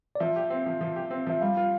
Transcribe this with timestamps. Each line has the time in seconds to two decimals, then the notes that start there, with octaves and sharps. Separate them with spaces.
0.15 D5
0.20 F3 E5
0.36 G4
0.50 C4
0.66 F3
0.81 F3
0.96 G4
1.11 C4
1.27 F3 E5
1.41 G3 F5
1.57 F4